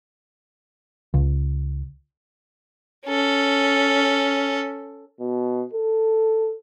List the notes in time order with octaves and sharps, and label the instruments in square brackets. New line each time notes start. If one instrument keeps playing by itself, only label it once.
[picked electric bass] C#2
[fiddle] C#4 A4
[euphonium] B2
A4